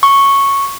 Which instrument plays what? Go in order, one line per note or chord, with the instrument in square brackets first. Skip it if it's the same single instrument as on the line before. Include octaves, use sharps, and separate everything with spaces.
[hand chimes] C#6